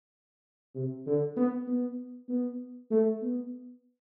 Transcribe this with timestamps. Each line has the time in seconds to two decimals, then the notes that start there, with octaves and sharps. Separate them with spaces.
0.75 C3
1.06 D3
1.37 B3
1.67 B3
2.29 B3
2.91 A3
3.22 B3